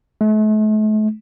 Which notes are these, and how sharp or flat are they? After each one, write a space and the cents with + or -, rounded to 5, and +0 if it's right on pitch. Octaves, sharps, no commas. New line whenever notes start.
A3 -40